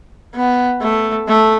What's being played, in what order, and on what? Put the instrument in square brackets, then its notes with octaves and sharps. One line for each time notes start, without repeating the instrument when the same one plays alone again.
[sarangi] B3
A3
A3